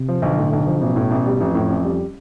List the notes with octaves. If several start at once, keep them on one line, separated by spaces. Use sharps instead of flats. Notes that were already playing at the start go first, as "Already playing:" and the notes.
Already playing: C3
F3
B1 D3
A2
B1
F3
A1 B2
A2
A1
G3
A1 F2
A2
A1
G3